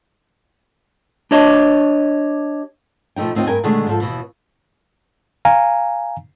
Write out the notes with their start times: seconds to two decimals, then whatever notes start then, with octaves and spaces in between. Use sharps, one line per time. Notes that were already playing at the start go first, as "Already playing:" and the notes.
1.31 D4 G4 C#5 D#5
3.16 B2 F3 A3 D#4 G5
3.35 D2 C4 D#4 F4 G5
3.47 G2 A#4 G5 G#5
3.63 B2 D3 D#3 G#3 A3 D4
3.87 G#2 F3 A4
4.00 D#2 B2 E3
5.45 F5 G#5 A#5